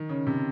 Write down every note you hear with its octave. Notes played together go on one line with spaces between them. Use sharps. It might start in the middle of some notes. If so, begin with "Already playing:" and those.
Already playing: D#3
C#3
C3